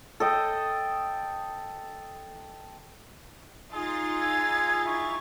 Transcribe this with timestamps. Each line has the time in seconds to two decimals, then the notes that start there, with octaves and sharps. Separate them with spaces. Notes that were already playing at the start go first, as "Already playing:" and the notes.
0.20 A4 D#5 G5
3.73 D#4 F4 G#4 A6
4.19 G#5 E6 G#6
4.83 E4 G5 C#6